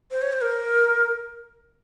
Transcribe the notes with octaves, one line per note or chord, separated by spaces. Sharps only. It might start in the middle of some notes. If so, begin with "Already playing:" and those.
C5
C#5
C5
A#4